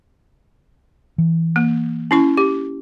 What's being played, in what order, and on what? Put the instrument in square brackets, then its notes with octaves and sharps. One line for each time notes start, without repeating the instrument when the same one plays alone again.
[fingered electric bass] E3
[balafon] A#3
C#4 E4 C#6
G4